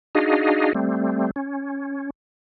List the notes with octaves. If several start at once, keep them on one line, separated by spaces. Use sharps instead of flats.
D4 D#4 F#4 G#4 D#5 F5
G3 A3 C4
C#4